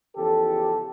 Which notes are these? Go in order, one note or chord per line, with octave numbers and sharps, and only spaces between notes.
E2 C#3 F3 G4 A4